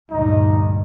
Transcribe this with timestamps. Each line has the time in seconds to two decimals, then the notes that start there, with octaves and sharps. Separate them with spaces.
0.11 D2 G2 A#2 D#4